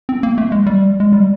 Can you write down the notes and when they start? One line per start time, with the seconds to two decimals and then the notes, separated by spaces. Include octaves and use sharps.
0.09 C4
0.23 A#3
0.38 A3
0.52 G#3
0.66 G3
1.00 G#3
1.12 G3